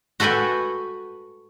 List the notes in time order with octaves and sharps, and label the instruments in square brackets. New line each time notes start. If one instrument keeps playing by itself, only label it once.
[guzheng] F#4 A4 B4 G5 G#5